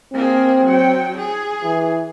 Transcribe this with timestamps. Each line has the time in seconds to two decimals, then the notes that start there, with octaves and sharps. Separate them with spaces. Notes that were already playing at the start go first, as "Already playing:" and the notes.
0.14 A#3 C4 G#4
0.66 F#3 G5
1.17 G#4
1.64 E3